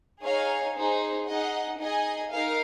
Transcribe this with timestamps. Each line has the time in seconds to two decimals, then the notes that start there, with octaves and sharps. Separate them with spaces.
0.23 D#4 G#4 C#5 F5 G#5
0.75 D#4 G#4 C5
1.27 D#4 G#4 D#5 F#5
1.79 D#4 G#4 D#5 G#5
2.31 D#4 A#4 F5